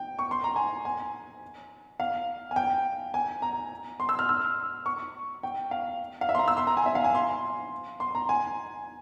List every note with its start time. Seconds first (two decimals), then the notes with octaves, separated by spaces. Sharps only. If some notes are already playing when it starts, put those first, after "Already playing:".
Already playing: G5
0.19 C#6
0.31 C6
0.44 A#5
0.56 G#5
0.85 G#5
2.00 F5
2.51 G#5
2.56 G5
3.14 G#5
3.42 A#5
4.00 C6
4.09 E6
4.19 F6
4.29 E6
4.86 C#6
5.43 G5
5.71 F5
6.21 F5
6.29 E5
6.35 C6
6.39 A#5
6.48 E6
6.57 C6
6.67 A#5
6.77 G#5
6.86 E5
6.95 F5
7.04 G#5
7.15 C6
8.00 C6
8.15 A#5
8.29 G#5